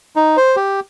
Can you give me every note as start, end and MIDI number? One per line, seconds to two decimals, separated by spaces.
0.16 0.37 63
0.37 0.56 72
0.56 0.80 67